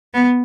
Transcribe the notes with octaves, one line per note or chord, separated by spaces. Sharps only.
B3